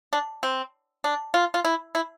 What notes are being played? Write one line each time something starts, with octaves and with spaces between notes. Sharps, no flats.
D4
C4
D4
F4
F4
E4
E4